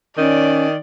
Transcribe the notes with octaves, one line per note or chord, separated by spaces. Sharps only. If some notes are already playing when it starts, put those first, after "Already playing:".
D#3 C#4 D5